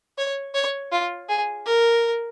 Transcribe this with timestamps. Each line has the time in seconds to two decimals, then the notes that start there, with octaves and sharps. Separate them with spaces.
0.18 C#5
0.54 C#5
0.91 F4
1.29 G#4
1.66 A#4